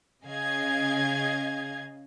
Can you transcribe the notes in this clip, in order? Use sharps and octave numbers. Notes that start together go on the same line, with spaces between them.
C#3 G#4 D#5 F5 G#6